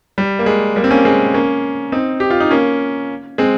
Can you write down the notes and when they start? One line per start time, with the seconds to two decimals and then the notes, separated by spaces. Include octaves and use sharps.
0.18 G3
0.39 A#3
0.46 G#3
0.76 G3 A#3
0.84 C4
0.90 A#3 C#4
1.05 G#3 C4
1.34 A#3 C#4
1.92 C4 D#4
2.20 G4
2.30 F4
2.40 D#4
2.51 A#3 C#4
3.38 G#3 C4